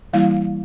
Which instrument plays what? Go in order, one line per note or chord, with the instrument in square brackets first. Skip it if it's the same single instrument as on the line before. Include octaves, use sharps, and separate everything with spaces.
[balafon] E3 G3 A#3 E4 F5